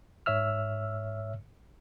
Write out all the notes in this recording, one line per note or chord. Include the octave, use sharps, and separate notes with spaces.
G#2 C#5 E5 E6 F6